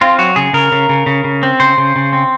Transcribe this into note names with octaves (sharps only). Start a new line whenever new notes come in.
C4 F4
F#3 F#4
C#3 G#4
C#3 A#4
C#3
C#3
C#3
C#3
C4
C#3 C5
C#3
C#3
C4